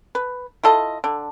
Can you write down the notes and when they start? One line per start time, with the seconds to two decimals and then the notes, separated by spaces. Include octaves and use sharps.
0.15 B4
0.63 E4 F4 A4 D#5
1.04 D3